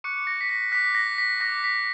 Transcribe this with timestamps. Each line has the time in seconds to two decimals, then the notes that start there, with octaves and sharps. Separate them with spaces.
0.04 C#6 D6 F#6 C#7
0.27 A#6
0.41 B6
0.49 A#6
0.72 D6 F#6 B6
0.95 A#6
1.18 B6
1.40 D6 F#6 A#6
1.64 B6